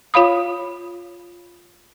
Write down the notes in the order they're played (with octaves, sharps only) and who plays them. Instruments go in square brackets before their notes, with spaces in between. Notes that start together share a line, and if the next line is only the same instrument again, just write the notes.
[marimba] F4 C#5 F5 B5 D#6